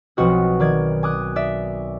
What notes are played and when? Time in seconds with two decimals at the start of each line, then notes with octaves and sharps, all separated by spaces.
0.17 B1 F3 C4 F#4 D#5
0.60 D#3 D5 G#6
1.03 G#5 D6 D#6 F#6
1.36 D5 E5